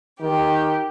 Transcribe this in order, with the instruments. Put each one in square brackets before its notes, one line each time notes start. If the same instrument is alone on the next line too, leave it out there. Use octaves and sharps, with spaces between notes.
[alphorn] D#3 [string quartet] G4